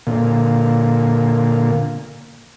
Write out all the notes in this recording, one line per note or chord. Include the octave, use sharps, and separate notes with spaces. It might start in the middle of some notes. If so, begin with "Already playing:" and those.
A#2 D3 A#3